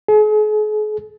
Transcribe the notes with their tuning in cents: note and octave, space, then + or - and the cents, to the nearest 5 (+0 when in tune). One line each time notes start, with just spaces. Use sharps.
G#4 +40